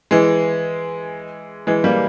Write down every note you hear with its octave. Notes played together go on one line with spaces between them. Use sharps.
E3 G#3
E3 G#3
G3 A#3